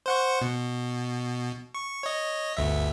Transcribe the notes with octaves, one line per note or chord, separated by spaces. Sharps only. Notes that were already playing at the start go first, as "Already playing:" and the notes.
C5 F#5 C#6
B2
C#6
C#5 D#5
G1 D2 E5